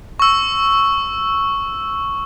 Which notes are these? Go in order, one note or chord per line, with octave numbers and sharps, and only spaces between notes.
C#6 E6